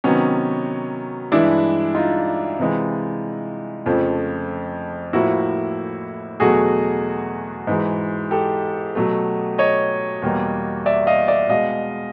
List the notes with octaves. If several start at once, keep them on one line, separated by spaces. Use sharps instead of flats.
C3 D#3 F#3 B3 C#4
G2 E3 G#3 D4 E4
D#4 F4
C3 E3 G#3
F2 C#3 F3 A3
A2 F3 A#3 E4 F#4
E2 B2 F#3 A3 F#4 G#4
G#2 E3 G#3
G4 A4
B2 F#3 A3
C#5 D#5
E2 B2 G3 A#3
D5 E5
D#5 F5
D5 E5
B2 G#3 D#5 F5